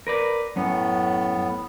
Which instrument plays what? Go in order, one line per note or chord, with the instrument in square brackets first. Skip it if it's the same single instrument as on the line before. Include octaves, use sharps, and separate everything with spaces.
[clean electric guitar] A#4 B4 D5
[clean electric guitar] F#2 C#4 [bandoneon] A2 B3